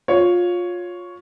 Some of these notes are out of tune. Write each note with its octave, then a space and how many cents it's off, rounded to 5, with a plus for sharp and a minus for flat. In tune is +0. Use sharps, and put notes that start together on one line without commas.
F4 +20 C#5 +5